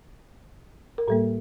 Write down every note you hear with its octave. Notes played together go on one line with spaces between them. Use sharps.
A#4
A2 G3 A#3 A4